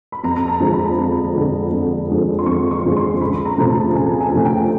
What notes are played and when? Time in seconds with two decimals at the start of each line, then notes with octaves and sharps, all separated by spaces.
0.12 B5
0.24 F2 A#5
0.36 A#5
0.48 A5
0.60 D3 F3 G#3
0.73 B5
0.98 F2
1.35 D3 F3 G#3
1.72 F2
2.09 D3 F3 G#3
2.39 C6
2.46 F2 C#6
2.71 C#6
2.84 D3 F3 G#3
2.97 C6
3.21 C#2 B5
3.45 A#5
3.57 C3 F3 A3
3.70 A5
3.95 C#2 G#5
4.20 G#5
4.32 C3 F3 A3
4.45 G5